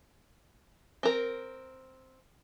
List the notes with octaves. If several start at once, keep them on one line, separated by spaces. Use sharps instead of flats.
C4 A#4